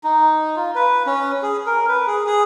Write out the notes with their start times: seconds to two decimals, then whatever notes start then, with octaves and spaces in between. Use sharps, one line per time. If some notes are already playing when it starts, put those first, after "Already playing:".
0.04 D#4
0.56 F4
0.75 B4
1.06 C#4
1.43 G#4
1.66 A#4
1.88 B4
2.07 G#4
2.27 G#4